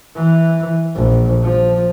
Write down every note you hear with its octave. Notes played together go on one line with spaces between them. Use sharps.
E3
A#1
F3